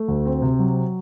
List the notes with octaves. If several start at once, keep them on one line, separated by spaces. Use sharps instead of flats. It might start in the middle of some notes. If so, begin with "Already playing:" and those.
Already playing: A3
D2
C4
C3
F#3